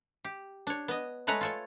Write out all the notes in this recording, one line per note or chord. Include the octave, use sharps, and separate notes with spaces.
G4
D4 C#5
B3 D#5
G#3 A3 B4 C#5 A#5
F4 A4 C#5